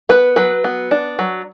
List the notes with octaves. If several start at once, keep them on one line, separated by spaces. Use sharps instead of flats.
B3 B4
F#3 B4
B3
D4
F#3